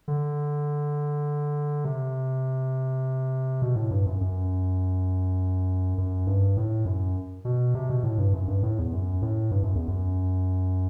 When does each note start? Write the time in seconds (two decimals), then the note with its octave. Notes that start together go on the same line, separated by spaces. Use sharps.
0.08 D3
1.85 C3
3.62 B2
3.76 A2
3.91 G2
4.06 F#2
4.21 F#2
5.98 F#2
6.27 G2
6.57 A2
6.86 F#2
7.45 B2
7.74 C3
7.89 B2
8.03 A2
8.18 G2
8.34 F#2
8.48 G2
8.63 A2
8.78 E2
8.93 F#2
9.22 A2
9.51 G2
9.63 F#2
9.75 E2
9.87 F#2